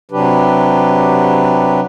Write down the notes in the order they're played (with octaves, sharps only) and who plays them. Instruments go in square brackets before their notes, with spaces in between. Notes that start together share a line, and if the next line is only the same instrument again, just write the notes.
[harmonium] C3 F#3 D4 G4 B4